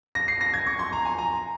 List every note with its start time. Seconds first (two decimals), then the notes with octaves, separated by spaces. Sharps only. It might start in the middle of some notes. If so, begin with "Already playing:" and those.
0.15 A#6
0.28 C7
0.41 A#6
0.54 G#6
0.67 C#6
0.79 C6
0.92 A#5
1.05 G#5
1.18 A#5